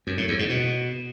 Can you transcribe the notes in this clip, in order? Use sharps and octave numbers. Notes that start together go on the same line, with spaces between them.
F#2
A2
E2
G#2
B2